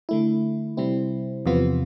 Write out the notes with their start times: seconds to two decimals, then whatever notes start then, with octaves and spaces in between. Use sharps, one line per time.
0.09 D3 A3 E4
0.77 C3 G3 C4 E4
1.46 E2 C3 F3 B3 F4